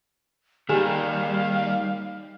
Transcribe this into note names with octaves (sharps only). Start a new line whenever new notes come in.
D#2 D#3 G3 G4 G#4 F5 G#5